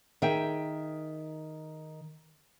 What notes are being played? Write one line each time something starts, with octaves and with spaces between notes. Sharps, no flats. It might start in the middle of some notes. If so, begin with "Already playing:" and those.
D#3 G#4 E5 G5